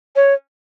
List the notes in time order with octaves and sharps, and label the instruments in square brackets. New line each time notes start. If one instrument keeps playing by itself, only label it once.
[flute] C#5